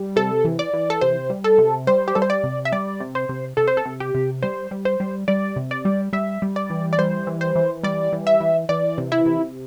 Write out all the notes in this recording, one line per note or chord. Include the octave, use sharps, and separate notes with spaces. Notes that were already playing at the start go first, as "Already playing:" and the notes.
Already playing: G3
C3 A4
E3
D5
E3
A4
C3 C5
G3
A4
C3
G3 C5
G4
G3 A4
C5
D5
C3
E5
G3 D5
C3
C5
C3
C3 A4
C5
A4
C3
G4
C3
G3 C5
G3
C5
G3
G3 D5
C3
D5
G3
G3 E5
G3
D5
E3
D5
G3 C5
E3
C5
E3
G3 D5
E3
E5
E3
E3 D5
C3
E4
C3